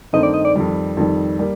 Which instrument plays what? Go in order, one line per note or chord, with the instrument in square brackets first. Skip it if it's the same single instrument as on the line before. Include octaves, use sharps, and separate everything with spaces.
[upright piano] G2 D#3 A3 C4 D#4 [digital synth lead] D#5
[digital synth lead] D5
D#5
D5
[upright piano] F2 D#3 G3
F2 D#3 G3
G3 A#3